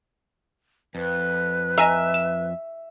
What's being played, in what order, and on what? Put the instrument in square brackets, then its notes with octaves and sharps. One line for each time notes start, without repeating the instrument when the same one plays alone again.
[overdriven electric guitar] F2 [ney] B4
[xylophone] D#5 G#5 A#5 [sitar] E5
[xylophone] E7